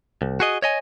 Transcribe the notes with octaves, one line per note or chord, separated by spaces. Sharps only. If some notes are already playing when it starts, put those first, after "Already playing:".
C2
F#4 G#4 D#5
C#5 D#5 G#5